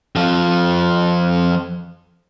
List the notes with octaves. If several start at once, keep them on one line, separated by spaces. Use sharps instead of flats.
F2 F3